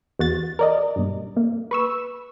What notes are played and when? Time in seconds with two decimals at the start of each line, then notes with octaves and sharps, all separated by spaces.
0.19 E2 F#4 A6
0.59 A#4 D5 D#5
0.96 B1 G2
1.37 A#3
1.71 B4 C#6 E6